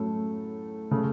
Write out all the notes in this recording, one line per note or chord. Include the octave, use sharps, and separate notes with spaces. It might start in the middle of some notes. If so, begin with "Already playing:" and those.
Already playing: A2 F#3 A3 C#4 A4
C#3 A3 C#4